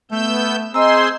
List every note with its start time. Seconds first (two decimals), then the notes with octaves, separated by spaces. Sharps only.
0.11 A3 B3 E6 G6
0.74 C4 G#4 C5 D#5 G#5 A#5 C6 E6